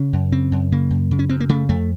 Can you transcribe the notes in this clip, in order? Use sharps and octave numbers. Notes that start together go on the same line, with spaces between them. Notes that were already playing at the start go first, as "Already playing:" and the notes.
Already playing: C#3 C#4
F#2
C#3 C4
F#2
C#3 A#3
F#2
C#3
C#4
F#2 C4
A#3
C#3 A3
F2 A3